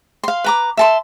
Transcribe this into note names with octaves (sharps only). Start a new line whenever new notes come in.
F5 C6
B4 A#5 D6
E5 A5 C6